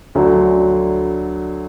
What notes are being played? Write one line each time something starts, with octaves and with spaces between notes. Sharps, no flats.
D2 D3 F#3